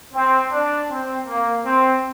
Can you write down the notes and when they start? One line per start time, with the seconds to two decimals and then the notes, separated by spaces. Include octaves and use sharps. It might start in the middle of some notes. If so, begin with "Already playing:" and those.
0.14 C4
0.52 D4
0.90 C4
1.27 A#3
1.65 C4